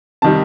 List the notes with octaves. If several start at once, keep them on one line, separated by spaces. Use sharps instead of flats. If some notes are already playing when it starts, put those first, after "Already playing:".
C3 D#3 G3 A5